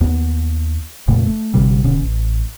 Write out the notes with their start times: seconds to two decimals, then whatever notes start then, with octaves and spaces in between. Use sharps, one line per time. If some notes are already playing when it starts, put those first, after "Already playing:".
0.01 D#2 B3
1.08 F1 A#2 C#3 A3
1.26 A3
1.54 G#1 D2 C3 G3
1.84 D1 B2 D3 C#4
2.00 A1